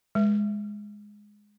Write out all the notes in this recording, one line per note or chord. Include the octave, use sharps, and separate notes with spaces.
G#3